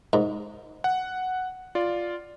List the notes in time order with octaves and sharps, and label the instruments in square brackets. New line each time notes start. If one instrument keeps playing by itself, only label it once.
[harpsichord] G#2
[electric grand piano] F#5
F4 D5